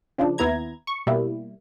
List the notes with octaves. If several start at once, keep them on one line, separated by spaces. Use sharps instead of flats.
C#3 F3 D4
D#2 B3 E4 A#5 G#6
C#6
B2 G3 A#3 E4